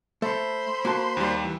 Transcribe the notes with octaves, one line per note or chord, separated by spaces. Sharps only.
A3 A4 C5 B5 C6
A#3 F#4 A5
D#2 G3
E3